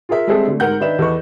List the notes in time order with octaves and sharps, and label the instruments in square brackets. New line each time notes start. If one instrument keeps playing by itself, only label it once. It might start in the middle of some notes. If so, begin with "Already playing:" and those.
[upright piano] F4 G#4 A#4 E5
G3 G#3 C4 G#4 A4 E5
D3 A3
G#2 A#4 F#5 G6
D#3 D4 D#4 B4 E5 E7
E2 A4 B4 D#5 C#6